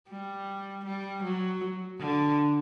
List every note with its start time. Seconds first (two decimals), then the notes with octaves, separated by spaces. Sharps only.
0.11 G3
0.85 G3
1.23 F#3
1.99 D3